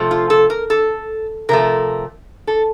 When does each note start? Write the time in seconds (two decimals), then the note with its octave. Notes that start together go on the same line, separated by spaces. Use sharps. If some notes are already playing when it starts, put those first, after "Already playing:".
Already playing: C3 F3 A3
0.11 F4
0.30 A4
0.50 A#4
0.70 A4
1.49 C3 F3 A3 A#4
2.47 A4